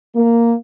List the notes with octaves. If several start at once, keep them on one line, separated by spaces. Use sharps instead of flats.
A#3